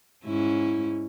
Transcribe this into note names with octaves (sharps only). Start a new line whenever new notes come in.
G#2 C#4 E4